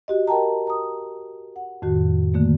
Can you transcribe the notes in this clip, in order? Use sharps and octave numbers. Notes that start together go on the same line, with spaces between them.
F#4 G4 D#5
A#4 D#5 G5 A5 A#5
A#5 D#6
F#5
F2 A2 D#3 F#4
D3 D#3 A3 A#3